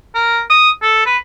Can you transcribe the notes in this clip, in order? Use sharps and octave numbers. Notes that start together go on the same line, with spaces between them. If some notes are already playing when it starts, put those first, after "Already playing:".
A#4
D#6
A4
B4